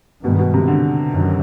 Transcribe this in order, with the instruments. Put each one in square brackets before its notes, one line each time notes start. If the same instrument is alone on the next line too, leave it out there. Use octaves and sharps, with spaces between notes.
[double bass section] G2 D#3 G#3 B3 [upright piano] B2
[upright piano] B2
C3
D3
[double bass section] F#2 D#3